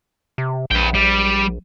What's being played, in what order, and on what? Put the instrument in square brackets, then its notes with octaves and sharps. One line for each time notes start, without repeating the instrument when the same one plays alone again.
[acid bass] C3
[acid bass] A#1 [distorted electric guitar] B4 G5
[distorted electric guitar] G3